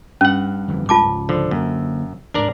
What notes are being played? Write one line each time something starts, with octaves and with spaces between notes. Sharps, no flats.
G2 C#4 F#5
F2 D3 E3
C#2 G#2 C#3 F4 A5 D6
D3 F3
F#2 D3 A#3
D2 G#2 D4 A#4 D5